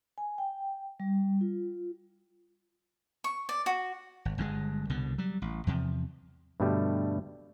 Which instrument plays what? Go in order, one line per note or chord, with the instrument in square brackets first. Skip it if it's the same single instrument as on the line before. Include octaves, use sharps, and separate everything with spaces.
[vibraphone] G#5
G5
G3
F4
[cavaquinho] C#6
D5
F#4
[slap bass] G#1
G1 G2 C3 G#3
C2 B2 D3
F#3 G3
A1
E2 C3 F3
[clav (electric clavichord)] G2 B2 D3 G3 A3